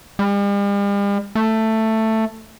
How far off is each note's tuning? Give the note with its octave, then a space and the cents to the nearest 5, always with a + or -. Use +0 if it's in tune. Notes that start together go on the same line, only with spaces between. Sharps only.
G3 +45
A3 +10